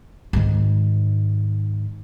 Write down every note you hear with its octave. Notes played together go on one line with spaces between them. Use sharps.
G#2 D#3